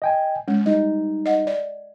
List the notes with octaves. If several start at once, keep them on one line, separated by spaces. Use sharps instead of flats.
D#5 G5 G#5
G#3 C#4
G3 D#4 D#5
D#5 F#5
D5